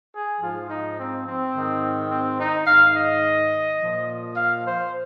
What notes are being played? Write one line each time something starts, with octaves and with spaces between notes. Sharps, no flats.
G#4
G#2 F3 F4
D#4
C4
C4
G#2 D#3
C4
D#4
G#2 D#3 F5
D#5
A#2 F3
F5
C5